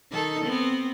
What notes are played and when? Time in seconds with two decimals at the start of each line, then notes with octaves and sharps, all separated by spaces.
0.12 D#3 D#4 A4
0.46 B3 C4